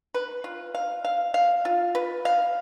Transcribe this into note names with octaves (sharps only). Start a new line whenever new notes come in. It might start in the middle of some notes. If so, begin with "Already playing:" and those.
B4
F4
F5
F5
F5
F4
B4
F5